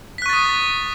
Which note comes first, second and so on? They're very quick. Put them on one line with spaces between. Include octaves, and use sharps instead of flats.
B6 F#6 C#6 A6 D#6